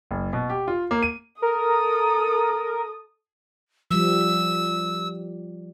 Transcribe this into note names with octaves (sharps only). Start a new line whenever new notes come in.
F#1
B2
G4
F4
A#3
D#7
A4 A#4 D#6
F3 G3 E6